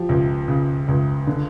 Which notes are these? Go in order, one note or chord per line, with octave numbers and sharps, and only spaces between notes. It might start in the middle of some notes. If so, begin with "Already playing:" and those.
Already playing: F3 G4
C#2
C#3
C#2
D3